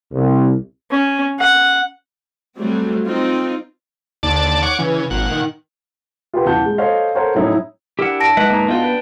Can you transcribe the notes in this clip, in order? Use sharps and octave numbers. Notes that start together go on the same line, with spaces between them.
C2
C#4
F#5
F#3 G3 A3 C4
C4 D#4 F4
D#2 D3 D5 A5
C#5 F#5 D6
C#3 E3
G#1 A#2 F#5
D#3
F4 G4 B4 G5
D#1 E3 F#5 A5 G6
G#3
A4 C5 C#5 D#5 F5
A4 A#4 C5 C#5 F#5
A2 F#3 C#4 D#4 E4
D4 E4 G4 A#4 F#5
A5 A#6 D7
G#3 D#4 B4 D#5 E5 F#5
C#2 G#2 A#3 A#5
B3 D4 D#4 F4 F#4 G5
B4